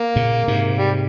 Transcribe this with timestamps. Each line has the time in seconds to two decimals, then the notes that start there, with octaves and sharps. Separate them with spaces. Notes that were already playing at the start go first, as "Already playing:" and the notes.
Already playing: A#3
0.16 A#2 C#3
0.48 G#2 C3
0.79 G3